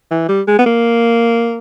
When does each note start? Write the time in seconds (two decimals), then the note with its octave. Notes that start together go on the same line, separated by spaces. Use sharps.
0.11 E3
0.29 G3
0.48 G#3
0.59 B3
0.66 A#3